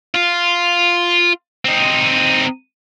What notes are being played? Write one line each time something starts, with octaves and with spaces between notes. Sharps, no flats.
F4
C4 D#4